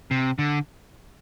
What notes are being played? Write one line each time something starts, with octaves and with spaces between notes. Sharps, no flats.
C3
D3